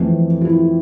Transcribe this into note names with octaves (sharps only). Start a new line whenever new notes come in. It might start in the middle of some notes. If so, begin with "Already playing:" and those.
Already playing: F2 E3 A3 C4
F4
E4